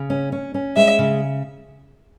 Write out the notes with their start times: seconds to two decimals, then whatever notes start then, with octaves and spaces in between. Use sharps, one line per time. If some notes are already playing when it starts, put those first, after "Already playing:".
Already playing: C#3
0.10 C#4
0.32 C#4
0.54 C#4
0.76 G#3 E5
0.99 C#3